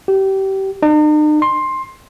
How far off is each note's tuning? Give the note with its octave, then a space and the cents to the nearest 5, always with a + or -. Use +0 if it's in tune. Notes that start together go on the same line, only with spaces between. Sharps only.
G4 -25
D#4 -45
C6 +15